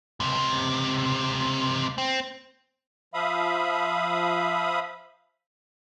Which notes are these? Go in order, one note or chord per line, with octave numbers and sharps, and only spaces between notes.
C#2 C3
C4
F3 E5 F5 B5 D#6